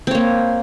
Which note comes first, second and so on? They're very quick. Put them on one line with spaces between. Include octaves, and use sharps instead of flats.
C4 C#5 A#3